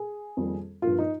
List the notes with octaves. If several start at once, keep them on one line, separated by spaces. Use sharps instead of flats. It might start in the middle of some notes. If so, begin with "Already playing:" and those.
Already playing: G#4
F2 D#3 G3 A#3
G2 F3 A#3 F4
D#4